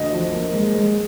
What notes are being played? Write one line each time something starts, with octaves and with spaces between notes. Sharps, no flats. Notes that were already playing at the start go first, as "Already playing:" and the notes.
Already playing: D2 D#5
F3
A#3
G#3
G#3